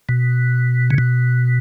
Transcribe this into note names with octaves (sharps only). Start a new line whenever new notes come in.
B2
C#3
B2